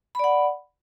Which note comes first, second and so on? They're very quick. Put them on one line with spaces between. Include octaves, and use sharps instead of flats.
B5 D5 F#5